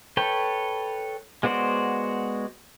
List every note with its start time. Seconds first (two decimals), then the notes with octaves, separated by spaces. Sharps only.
0.17 A4 B4 C#5 G5
1.43 G#3 B3 F#4 C5 D5